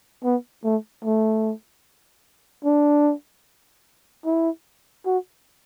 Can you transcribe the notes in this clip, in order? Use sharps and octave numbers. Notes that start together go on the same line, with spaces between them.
B3
A3
A3
D4
E4
F#4